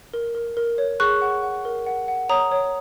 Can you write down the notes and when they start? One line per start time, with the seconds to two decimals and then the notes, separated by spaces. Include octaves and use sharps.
0.14 A#4
0.35 A#4
0.57 A#4
0.78 C#5
1.00 G#4 C#6 F#6
1.21 F#5
1.43 F#5
1.65 A#4
1.86 F#5
2.08 F#5
2.29 C#5 A#5 D#6
2.52 C#5